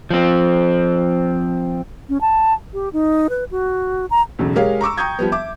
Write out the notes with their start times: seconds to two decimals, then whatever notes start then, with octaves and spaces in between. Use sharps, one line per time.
0.10 F3 C4
2.09 C#4
2.21 A5
2.73 G4
2.93 D#4
3.30 B4
3.51 F#4
4.11 A#5
4.39 B1 E2 C#3
4.56 G#3 G4 G#4 A#4 C#5 F5
4.81 A#5 C#6 D6 E6
4.97 G5 A#5 C#6 D#6 G6 G#6
5.19 F3 G3 B3
5.32 E5 D6